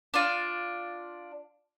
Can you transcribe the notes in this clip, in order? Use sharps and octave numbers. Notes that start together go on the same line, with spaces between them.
D4 F4